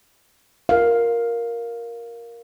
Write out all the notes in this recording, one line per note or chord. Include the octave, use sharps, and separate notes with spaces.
A#4 F5